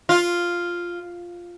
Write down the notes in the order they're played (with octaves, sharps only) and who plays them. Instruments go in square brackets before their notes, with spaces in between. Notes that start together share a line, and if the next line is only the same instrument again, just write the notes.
[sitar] F4